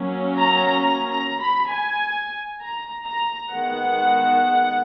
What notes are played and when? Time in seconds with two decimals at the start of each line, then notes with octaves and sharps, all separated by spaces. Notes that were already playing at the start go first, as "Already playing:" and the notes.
Already playing: F#3 A#3 C#4
0.36 A#5
0.80 A#5
1.10 A#5
1.40 B5
1.70 G#5
2.61 A#5
3.07 A#5
3.51 D#3 G#3 B3 F#5